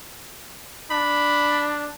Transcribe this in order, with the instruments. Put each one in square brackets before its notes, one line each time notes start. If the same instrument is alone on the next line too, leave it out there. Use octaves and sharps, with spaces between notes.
[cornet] D4 [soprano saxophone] B5